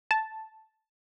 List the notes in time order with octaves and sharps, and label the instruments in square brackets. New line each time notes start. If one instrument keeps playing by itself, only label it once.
[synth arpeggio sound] A5